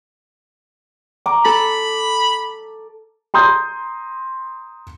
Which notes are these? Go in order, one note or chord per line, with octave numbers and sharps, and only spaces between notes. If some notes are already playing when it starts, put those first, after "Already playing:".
A#5 D6
A4 B5
A#5 C6 D#6 G6